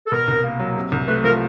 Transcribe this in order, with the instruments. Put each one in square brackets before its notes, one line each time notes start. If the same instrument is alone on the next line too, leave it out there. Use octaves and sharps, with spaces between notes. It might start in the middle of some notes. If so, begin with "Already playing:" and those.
[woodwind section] A4
[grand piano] B2 [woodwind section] A#4
[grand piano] C2
A#3
F#3
C3
C2
[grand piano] A3 [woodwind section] B4
[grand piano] F3 [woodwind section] A#4